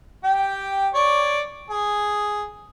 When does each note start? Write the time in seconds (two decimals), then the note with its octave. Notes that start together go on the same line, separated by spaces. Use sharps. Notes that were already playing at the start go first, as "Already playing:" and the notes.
0.24 G4 G5
0.94 C#5 D5
1.70 G#4